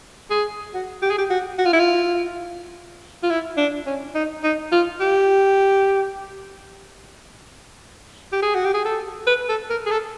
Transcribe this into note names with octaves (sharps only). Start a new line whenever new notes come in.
G#4
F#4
G4
G#4
G4
F#4
F#4
F4
E4
F4
F4
E4
D4
C#4
D#4
D#4
F4
G4
G4
G#4
F#4
G4
G#4
A4
B4
A4
A#4
G#4
A4